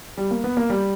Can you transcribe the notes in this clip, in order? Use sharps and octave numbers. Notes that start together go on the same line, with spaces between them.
G3
A#3
B3
A#3
G3